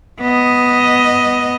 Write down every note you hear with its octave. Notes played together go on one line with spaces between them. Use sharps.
B3 D#5